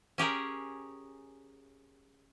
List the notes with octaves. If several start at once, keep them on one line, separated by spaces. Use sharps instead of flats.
C#4 G4 G#4 A#4